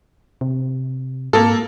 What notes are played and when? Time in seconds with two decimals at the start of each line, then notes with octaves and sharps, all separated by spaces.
0.41 C3
1.33 G#2 A#3 A4